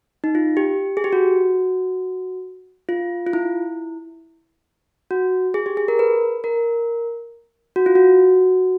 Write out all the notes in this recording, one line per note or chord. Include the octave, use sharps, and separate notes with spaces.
D#4
F4
G4
G#4
G4
F#4
F4
F4
E4
F#4
G#4
G4
G#4
A#4
B4
A#4
F#4
F4
F#4